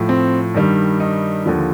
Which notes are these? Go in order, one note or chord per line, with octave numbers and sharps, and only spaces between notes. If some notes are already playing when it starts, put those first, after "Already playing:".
Already playing: A2 F3
C4
G2 D#3 G3
D#4
D#2 D3 F3